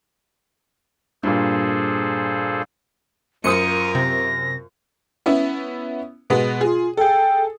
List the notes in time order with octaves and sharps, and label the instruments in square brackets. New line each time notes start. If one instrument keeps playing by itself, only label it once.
[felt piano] G2 A#2 [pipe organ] G#4 A4 C5
[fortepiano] F#2 C5 D#6 [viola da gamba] F4 A#4 [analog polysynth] C#7 [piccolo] D#7
[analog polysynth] C3 [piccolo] A#6
[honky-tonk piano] B3 C#4 E4
B2 G#3 B3
[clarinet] F4 [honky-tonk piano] G#4
[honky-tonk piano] G#4 A4 [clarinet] G5